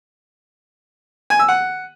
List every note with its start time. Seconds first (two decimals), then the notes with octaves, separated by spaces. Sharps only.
1.30 G#5
1.39 E6
1.48 F#5